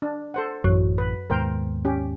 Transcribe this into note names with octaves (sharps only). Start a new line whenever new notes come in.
D4
A4 C5 F#5
A1 F#2 E3
B4
D#2 G#2 B2 A#4 C5 G5
C#4 G4